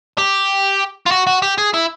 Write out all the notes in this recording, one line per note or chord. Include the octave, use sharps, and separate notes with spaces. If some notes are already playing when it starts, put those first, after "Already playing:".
G4
F4
F#4
F#4
G4
G#4
E4